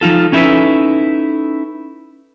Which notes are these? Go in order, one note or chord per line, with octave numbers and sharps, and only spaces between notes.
F3 D#4 F4 A4
C#4 D#4 E4 G4 A4 B4